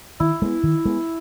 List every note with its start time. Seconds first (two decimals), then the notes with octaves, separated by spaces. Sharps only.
0.20 D#3 E4
0.42 G#3 B3
0.63 D#3
0.85 G#3 B3